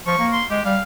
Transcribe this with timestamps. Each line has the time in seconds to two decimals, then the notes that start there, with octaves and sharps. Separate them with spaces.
0.07 F3 C#6
0.19 A#3
0.33 C6
0.50 G#3 G4
0.65 G3 F5